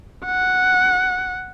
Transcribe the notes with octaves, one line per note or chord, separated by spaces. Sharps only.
F#5